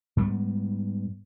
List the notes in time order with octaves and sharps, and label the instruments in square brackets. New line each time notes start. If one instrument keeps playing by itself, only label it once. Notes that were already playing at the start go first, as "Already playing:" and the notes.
[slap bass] G#2 G3 B3